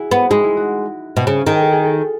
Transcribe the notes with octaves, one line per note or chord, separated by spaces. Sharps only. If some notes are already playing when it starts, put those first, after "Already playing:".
Already playing: E4 F#4 G#4
B3
G#3 D#4
E4
F#4
B2
C#3
D#3 G#4
A4
G#4
A4